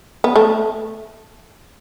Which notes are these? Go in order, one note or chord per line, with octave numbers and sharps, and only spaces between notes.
B3
A3